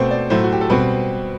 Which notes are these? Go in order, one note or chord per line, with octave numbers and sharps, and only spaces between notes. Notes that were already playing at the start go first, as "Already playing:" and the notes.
Already playing: B2 A3 C4 C5
D5
A2 F#3 A3 C5
F#4
G4
A4
B2 G3 C4 B4